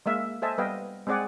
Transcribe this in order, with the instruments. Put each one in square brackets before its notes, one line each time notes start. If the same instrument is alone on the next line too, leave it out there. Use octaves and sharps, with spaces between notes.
[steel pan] G#3 A#3 E5 F5
A4 C5 D#5 E5 G#5 A5
G3 B3 B4 D#5 F5 G5
G#3 C4 G#4 D5 F#5 G#5